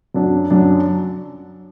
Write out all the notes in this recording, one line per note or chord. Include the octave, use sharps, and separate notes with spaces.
F#2 F#3 D4
F#2 F#3 D4